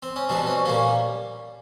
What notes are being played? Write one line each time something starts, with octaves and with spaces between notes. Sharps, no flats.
C4
C#4
B2 G3 C4 D4
C#4
A#2 G3 A#3 C#4